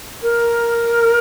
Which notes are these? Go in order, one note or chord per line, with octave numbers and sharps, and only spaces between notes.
A#4